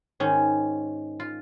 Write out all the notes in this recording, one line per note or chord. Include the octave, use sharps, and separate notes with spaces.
G#2 D#3 C#4
F4